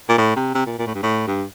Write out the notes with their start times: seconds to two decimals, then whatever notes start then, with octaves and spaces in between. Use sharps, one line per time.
0.09 A#2
0.18 A2
0.36 C3
0.55 C3
0.66 A#2
0.79 A#2
0.87 A2
0.95 G2
1.03 A2
1.27 G2